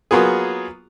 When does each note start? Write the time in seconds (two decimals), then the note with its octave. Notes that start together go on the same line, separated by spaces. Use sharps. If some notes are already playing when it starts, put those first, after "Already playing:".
0.11 F#3 A#3 B3 F4 G#4